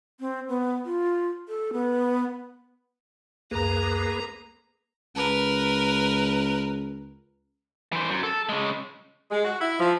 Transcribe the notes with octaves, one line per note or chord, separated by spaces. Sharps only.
C4
B3
F4
A4
B3
C#2 F#2 A#3 G#4 B4 A#5
C#2 A#4 B4
E3 C5
F#2
A4
C#3 G#3
G#3
F#4
E4
F3